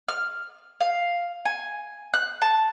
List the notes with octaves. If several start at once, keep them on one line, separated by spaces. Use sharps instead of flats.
F6
F5
G#5
F#6
A5